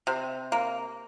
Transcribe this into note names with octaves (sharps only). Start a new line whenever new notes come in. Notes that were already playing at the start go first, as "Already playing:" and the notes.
C3
A#3